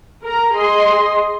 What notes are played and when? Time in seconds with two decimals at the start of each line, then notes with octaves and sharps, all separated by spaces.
0.22 A#4 A#5
0.54 G#4 D#5 C6